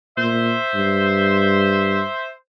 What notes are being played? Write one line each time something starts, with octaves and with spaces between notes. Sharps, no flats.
A#2 C5 E5
G2